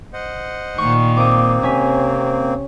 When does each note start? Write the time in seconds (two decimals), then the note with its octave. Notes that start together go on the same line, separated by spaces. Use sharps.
0.13 C5 D#5 F#5
0.78 A#2 D#3 C#6
1.17 A#3 C4 D6 D#6
1.63 C3 C#4 G#5 B6